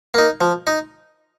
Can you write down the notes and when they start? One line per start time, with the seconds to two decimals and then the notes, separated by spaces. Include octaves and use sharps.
0.14 A#3 D#4
0.41 F3
0.67 D#4